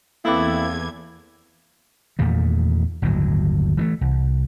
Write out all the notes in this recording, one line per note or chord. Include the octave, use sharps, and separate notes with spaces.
E2 A#3 C4 E4 A4 B4 D6 G#6
E2 A#2 D#3 A3
G1 D#2 A2 F#3
E3 F3 A3
C2